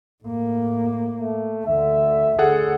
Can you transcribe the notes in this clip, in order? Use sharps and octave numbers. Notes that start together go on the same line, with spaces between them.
A2 A#3
A3
D2 D3 E5
D2 D3 G#4 A4 F#5